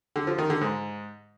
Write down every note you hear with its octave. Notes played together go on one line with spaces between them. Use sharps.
D3
F3
D#3
D3
G#2